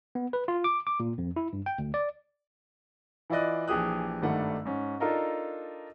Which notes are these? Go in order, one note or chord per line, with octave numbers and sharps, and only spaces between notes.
B3
B4
F4
D6
D6
A#2
F2
E4
G2
G5
D2
D5
E3 E4 F4 D5 D#5 F#6
A#1 E3 G4 G#4 D#6 F#6
G#1 G2 D#3 G3 A3 F#5
G#2 C#4
D4 D#4 F4 A4 A#4 D#5